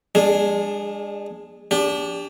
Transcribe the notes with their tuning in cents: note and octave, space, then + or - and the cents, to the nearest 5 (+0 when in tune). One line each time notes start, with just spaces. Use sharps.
G#3 -30 D4 +0 G#4 +0
D4 -25 G4 +30